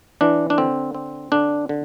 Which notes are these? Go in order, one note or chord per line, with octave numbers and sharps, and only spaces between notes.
E3 D4
D4
D3 C4
C4
D3 D4
D3